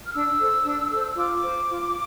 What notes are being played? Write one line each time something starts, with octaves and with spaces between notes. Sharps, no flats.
F6
D4 E6
A4 C5
D4
A4 C5
F4 D6
C5
F4